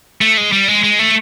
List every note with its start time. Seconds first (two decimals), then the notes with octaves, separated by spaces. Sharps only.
0.21 A3
0.37 G#3
0.52 G3
0.68 G#3
0.84 G#3
0.99 A3